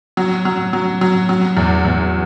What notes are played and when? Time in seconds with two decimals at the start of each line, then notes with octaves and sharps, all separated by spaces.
0.17 F#3
0.45 F#3
0.73 F#3
1.01 F#3
1.29 F#3
1.57 E2
1.85 E2